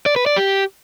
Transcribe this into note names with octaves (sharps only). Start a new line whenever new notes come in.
D5
B4
D5
G4